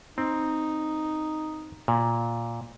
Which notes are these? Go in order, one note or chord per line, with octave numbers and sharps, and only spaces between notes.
C4 D#4
A#2